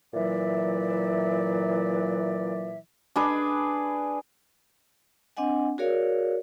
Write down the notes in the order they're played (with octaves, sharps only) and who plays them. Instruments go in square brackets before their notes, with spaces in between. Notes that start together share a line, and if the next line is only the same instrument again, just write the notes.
[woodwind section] A#2 E3 F#3 D5 E5
[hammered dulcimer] D4 G#4 B4
[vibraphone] C4 D4 D#5 F#5 G#5
F#4 G#4 A#4 C#5 D5 F5